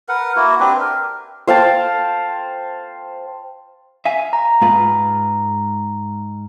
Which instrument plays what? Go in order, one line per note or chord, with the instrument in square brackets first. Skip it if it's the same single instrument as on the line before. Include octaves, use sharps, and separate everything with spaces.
[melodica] A#4 B4 F#5
A#3 E4 F#4
C4 D4 G4 B4
A#4
[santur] C5 F5 G5 A5
[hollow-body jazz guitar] E5 F5 G#5
[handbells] A#5
[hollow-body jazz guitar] G#2 F4 B4